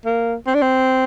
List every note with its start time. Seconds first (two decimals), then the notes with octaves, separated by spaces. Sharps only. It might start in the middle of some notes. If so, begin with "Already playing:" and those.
0.05 A#3
0.47 C4
0.54 D4
0.62 C4